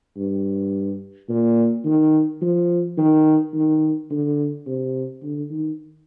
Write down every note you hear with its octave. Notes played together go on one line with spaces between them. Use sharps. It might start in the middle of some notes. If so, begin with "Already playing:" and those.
G2
A#2
D#3
F3
D#3
D#3
D3
C3
D3
D#3